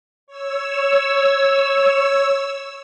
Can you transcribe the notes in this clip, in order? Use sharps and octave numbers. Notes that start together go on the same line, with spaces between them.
C#5 E6